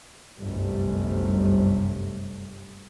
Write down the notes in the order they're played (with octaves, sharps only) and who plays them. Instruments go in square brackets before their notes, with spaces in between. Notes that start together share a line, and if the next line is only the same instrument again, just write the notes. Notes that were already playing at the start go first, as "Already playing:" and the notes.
[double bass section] G1 C2 F#2 C3 G3 A3